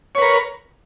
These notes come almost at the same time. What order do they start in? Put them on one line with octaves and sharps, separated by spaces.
C#5 B4 A#4